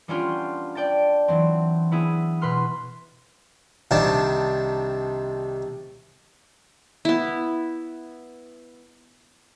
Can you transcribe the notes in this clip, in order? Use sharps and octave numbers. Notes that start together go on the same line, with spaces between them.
G3 B3 C#4 D4 F4 G4
D5 G5 A5 A6
E3 F#3 C4
B3 E4 G#4
B2 B4 C6 F6
C2 C3 D#3 D4 D5 A5
B3 E4